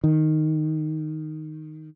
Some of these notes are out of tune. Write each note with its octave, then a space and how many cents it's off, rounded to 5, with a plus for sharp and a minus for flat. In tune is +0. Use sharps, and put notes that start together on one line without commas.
D#3 -5